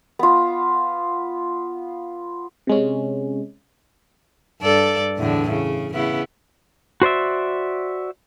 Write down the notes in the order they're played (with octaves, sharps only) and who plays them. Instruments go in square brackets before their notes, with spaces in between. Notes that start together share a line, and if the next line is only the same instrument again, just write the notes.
[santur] B3 F4
[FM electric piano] C3 G#3 C#4
[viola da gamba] G2 A4 D5
E2 A2 D3
C#3
C#3 B3 E4
[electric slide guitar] F#4 C5 D5 E5